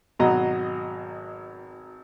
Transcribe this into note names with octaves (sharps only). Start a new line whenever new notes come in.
G#1 B2 F#3 D#5 A#5